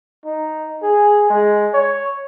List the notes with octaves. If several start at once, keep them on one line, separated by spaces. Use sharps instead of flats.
D#4
G#4
G#3
C#5